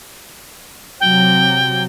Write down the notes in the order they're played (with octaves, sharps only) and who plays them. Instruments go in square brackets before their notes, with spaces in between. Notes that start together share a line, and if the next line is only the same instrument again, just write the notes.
[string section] C3 F#3 [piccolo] G5